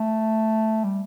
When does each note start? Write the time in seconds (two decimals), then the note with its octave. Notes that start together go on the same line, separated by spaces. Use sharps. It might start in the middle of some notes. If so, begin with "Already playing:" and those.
Already playing: A3
0.84 G3